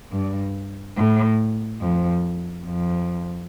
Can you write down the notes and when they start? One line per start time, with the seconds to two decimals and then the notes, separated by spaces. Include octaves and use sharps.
0.12 G2
0.97 A2
1.81 F2
2.66 F2